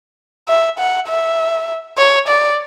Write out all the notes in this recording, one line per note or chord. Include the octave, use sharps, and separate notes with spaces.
E5
F#5
E5
C#5
D5